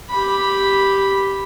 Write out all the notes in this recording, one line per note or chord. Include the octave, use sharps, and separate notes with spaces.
G4 B5